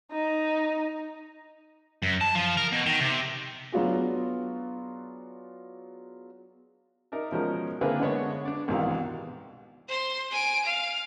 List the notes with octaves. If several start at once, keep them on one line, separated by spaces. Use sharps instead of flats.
D#4
F#2
A5
F3
A#4
B2
D#3
C3
F#3 B3 D4 F4 F#4 G#4
D#4 A#4 D5 E5
B2 F3 G#3 C#4 A#4
D3 A#3 C4 E4 G#4 B4
D3 G#3 B3 C#5
D4 D5
C2 G#2 B2 D#3 E3 F5
C5 C6
G#5 D7
F5